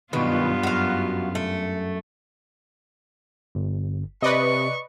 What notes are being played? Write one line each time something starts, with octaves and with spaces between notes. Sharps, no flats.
B1 G2 B2 D#3 B3 F4 B4
F#2 F#4 F5
A3
G1
C3 B4 D5 D#5 C#6